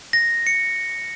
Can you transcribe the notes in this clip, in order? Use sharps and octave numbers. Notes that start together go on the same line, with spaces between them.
A#6
C#7